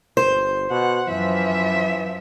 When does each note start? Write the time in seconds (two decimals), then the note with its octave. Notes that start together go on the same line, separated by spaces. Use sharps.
0.17 G1 C5
0.70 B2 F#5
1.08 F#2 E3 F3 E5